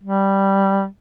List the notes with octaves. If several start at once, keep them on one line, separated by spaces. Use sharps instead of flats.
G3